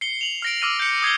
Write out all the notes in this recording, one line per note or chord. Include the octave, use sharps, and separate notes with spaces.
C7 C#7 G7
F7 F#7
F6 A#6 D7
D6 E6 F6 A#6 D#7
G6 C#7
D#6 G#6 C7 G7